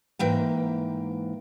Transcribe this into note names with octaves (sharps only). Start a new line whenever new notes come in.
G#2 E3 A#3 G5